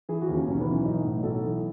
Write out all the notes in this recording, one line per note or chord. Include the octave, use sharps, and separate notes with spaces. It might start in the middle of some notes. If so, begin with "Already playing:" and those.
E3 G#4
F#4
D#2
C#4
B1 C#4
B3
E3
C#4
B1 D#4
A2
B1 A4
E3